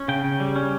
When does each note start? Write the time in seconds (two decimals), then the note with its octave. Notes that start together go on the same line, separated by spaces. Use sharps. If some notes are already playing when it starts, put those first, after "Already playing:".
Already playing: C#4
0.08 C#3 G5
0.24 C#3
0.40 G3
0.56 C#4